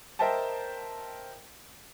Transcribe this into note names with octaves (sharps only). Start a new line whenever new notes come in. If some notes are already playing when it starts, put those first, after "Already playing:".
A#4 C5 D#5 E5 G5 A5